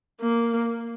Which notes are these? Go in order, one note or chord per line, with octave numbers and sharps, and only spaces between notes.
A#3